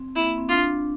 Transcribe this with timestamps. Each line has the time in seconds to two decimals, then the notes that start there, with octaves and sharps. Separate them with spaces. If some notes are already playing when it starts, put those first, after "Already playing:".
Already playing: C4
0.16 A#3 E4
0.27 A#3
0.38 C4
0.49 D4 F4